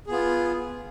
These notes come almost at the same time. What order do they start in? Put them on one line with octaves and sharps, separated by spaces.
G#4 B3 F4